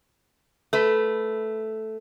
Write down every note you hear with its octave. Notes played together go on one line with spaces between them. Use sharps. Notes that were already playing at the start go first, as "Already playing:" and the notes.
A3 B4